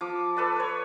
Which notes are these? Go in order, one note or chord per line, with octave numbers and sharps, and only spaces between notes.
F3 D6
A4 B4 D5
B4 C#5